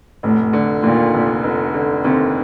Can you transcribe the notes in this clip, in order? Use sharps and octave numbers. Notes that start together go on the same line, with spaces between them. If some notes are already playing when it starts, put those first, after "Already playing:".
F1 A2
D3
D#2 A#2
F1
F1
D3
D#2 C3